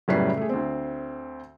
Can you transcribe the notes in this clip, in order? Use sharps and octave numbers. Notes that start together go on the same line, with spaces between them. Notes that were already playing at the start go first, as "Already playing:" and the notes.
F#1 F#2 A2 G3 B4 C7
A3 G#4
D2 C4